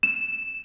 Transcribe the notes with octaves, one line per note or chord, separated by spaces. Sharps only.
E7